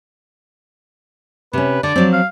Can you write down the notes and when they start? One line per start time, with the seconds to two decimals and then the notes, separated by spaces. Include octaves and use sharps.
1.53 C3 C#4 B4
1.83 D3 D5
1.96 F3 F#3 C4
2.13 F5